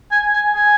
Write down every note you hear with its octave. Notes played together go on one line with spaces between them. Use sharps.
G#5
G#5
G#5